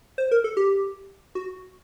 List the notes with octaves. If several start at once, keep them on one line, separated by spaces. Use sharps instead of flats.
C5
A#4
A4
G4
F#4